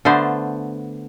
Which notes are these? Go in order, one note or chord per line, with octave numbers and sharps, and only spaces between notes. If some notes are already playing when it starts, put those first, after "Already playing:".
D3 A3 B3 C5